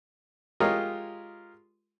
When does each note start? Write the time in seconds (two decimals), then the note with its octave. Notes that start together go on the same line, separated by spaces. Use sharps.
0.60 G#3 F4 G4 A#4 C#5 D#5